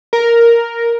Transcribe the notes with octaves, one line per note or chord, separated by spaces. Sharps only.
A#4